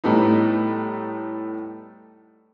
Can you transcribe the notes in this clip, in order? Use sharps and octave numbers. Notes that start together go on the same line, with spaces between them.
A2 G3 A3 B3 D#4